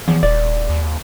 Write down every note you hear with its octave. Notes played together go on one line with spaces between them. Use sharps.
E2 F3
D#1 D5
D#2